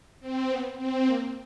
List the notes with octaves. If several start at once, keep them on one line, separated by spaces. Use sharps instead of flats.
C4
B3
C4
A#3